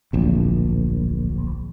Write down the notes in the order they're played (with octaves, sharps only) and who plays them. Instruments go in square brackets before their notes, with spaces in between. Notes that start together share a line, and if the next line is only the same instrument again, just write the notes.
[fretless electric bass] D1 A#1